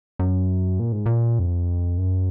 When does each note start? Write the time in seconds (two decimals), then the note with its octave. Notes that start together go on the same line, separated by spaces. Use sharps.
0.19 F#2
0.80 A#2
0.92 G#2
1.06 A#2
1.39 F2
1.98 F#2